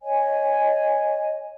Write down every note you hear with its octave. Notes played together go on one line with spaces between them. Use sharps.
C#5 D#5 G#5